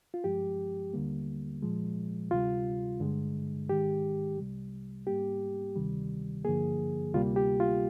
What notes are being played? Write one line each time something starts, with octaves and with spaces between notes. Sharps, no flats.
F4
G2 F3 G#3 G4
D#2 D3 G3 A#3
A#2 F3 G#3
D2 C3 G3 F4
G2 D3 G#3
G#2 D#3 G#3 G4
C2 C3 G3
G#2 G3 A#3 G4
D2 C3 D#3 G3
G2 D3 F3 A#3 G#4
D2 C3 G3 A#3 F4
G4
F4